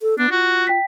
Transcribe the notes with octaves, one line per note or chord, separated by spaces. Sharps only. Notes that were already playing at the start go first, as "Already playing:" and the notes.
A4
B3 D4
F4 F#4
G5 B6